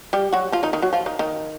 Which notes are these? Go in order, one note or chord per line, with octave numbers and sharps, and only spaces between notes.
G3 G4
F#3 F#4
F3 F4
D#3 D#4
D#3 D#4
F#3 F#4
F3 F4
D#3 D#4
D#3 D#4